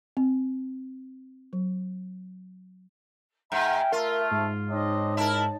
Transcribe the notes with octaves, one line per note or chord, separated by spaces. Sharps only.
C4
F#3
G#2 E5 G5 G#5 A#5
A3 F4 A#4
G#2
C4 D4 D#4 C#5 D#5
E4 A#4 A5